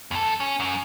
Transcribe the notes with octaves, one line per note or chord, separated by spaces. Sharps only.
E2 A4
C#4
F#2 C#4